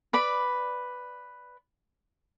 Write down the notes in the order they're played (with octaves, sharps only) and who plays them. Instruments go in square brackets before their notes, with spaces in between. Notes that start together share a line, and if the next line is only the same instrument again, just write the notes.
[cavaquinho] B4 D5 B5